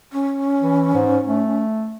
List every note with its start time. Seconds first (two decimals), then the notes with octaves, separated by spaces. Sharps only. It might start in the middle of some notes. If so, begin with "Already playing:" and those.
0.13 C#4
0.61 E3
0.94 G#2
1.25 A3